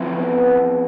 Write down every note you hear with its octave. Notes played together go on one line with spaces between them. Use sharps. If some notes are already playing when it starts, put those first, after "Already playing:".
Already playing: F3 C4 E4 B4
B3